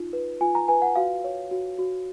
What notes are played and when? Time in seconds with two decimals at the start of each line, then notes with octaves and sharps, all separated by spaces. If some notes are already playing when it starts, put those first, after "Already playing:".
Already playing: D#4 F4
0.13 B4
0.41 F4 G#5
0.55 A#5
0.68 B4 G#5
0.82 F#5
0.96 F#4 F5
1.24 C#5
1.51 F#4
1.78 F#4